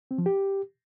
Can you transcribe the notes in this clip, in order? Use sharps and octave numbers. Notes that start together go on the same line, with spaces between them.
C4
F3
G4